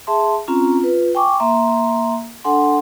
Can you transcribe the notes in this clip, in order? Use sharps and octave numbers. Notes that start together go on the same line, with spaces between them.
G#4 E5 A5 C6
C4 C#4 F4 A#5
F4 B4
G5 G#5 C#6 D6
A#3 E5 A#5 C6
D4 A4 F#5 G#5 C6